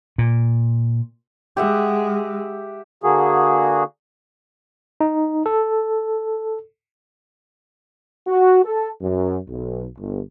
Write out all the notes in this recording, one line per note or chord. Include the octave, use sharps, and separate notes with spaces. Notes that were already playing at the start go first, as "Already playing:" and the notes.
A#2
G#3 G4 E5 F#5
D3 A#3 F#4 G#4
D#4
A4
F#4
A4
F#2
B1
G1